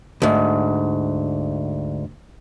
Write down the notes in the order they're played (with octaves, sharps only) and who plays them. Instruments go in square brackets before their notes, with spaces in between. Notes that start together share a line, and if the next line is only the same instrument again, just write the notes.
[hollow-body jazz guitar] D2 G#2